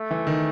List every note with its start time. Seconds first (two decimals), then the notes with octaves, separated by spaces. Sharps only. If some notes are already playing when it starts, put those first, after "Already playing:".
Already playing: A3
0.11 E3
0.27 D#3